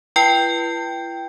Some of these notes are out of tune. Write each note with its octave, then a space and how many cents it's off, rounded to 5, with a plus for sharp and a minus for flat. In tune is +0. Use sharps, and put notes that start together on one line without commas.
E4 +45 B4 -25 G5 +0